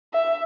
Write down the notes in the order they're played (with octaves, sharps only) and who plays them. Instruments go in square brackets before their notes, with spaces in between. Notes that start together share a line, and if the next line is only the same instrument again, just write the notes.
[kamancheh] E5